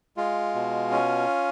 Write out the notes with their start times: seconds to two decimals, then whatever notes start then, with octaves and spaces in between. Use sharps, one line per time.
0.17 G#3 F4
0.54 B2
0.91 C#4